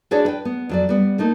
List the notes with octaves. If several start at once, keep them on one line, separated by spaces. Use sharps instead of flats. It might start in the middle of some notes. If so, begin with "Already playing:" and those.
D4 F#4 G#4 B4 C#5 D5
B4 G5
B3
F2 F#3 D5
G3 B3
A3 A#3 D#4